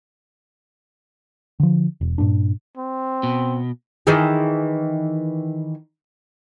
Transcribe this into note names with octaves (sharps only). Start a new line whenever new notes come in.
D3 F3
E1
G2 A#2 D4
C4
B2
D#3 E3 G#4